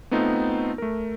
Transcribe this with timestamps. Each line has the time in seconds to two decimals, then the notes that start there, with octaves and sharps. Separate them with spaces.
0.11 A3 B3 C4 D#4 F4
0.78 A3 A#4